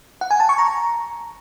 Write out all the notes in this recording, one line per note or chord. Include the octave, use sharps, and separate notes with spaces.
F#5
G#5
A5
C#6
A#5